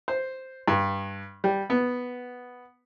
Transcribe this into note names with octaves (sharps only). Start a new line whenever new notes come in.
C5
G2
G3
B3